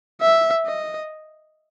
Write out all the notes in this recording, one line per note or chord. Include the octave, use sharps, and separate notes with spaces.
E5
D#5